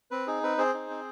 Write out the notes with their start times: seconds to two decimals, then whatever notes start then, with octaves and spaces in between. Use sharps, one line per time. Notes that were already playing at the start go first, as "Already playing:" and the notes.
0.11 C4 B4
0.27 D#4 G#4
0.43 C4 B4
0.58 C4 G#4 C5
0.74 D#4
0.90 C4